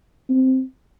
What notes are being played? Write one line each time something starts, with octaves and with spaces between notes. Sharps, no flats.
C4